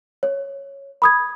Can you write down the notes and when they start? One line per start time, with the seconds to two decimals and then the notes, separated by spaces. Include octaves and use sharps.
0.23 C#5
1.02 B5 D#6 G#6